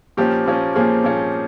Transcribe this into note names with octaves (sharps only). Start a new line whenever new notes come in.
A#2 F3 A#3 C#4 G4
A#2 F3 A#3 C#4
A#2 F3 A#3 C#4 G#4
A#2 F3 A#3 C#4